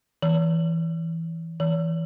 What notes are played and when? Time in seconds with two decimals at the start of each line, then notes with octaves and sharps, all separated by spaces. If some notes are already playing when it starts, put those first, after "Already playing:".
0.22 E3
1.60 E3